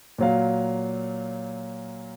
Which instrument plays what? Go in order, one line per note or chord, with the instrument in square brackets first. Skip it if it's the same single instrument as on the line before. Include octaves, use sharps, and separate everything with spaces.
[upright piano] A#2 F#3 F5